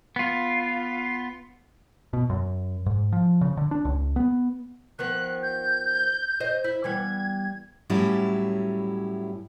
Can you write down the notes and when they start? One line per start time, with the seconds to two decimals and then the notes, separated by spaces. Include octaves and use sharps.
0.16 B3 F4
2.13 B2
2.30 F#2
2.86 G#2
3.13 F3
3.41 C#3
3.57 D3
3.71 D4
3.85 C#2
4.16 B3
4.99 D#3 F3 B3 F#6
5.43 G6
6.40 C5 D#5
6.64 E4
6.84 E3 G3 B3 G#6
7.90 A2 F#3 G3 C#4 E4